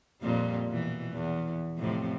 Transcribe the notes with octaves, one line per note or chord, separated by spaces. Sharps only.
F2 A#2 G3
B2 E3
E2
F2 A2 C3